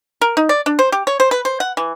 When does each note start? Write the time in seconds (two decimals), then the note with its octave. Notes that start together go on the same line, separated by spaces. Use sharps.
0.21 A#4
0.37 D#4
0.49 D5
0.66 D4
0.79 C5
0.92 G4
1.07 C#5
1.20 C5
1.31 B4
1.45 C5
1.60 F#5
1.77 E3